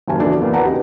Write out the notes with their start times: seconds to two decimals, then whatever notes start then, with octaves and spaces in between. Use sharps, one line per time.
0.08 F#1 D#2 F#4 G#5 A5
0.20 B2 E3 F#3 D4 A4
0.39 E2 A#3
0.53 E3 B4 F#5 A5 A#5
0.65 C#3 D#4 G4